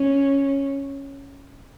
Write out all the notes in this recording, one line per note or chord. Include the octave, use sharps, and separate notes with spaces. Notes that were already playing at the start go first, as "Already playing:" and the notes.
Already playing: C#4